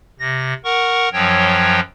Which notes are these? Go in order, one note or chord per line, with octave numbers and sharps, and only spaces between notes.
C3 A#6
A#4 F#5 C#6
F#2 F3 F#3 C#5 G5